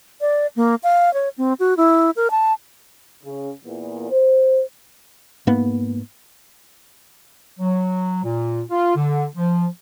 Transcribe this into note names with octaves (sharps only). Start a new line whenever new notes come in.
D5
A#3
F5
C#5
C4
F#4
E4
A#4
A5
C#3
E2 A#2
C5
G#2 A#3 B3
F#3
A#2
F4
D3
F3